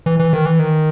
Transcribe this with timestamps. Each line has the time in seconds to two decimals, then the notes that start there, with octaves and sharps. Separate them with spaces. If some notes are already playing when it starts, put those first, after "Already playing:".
0.06 E3
0.19 E3
0.33 D#3
0.46 E3
0.59 D#3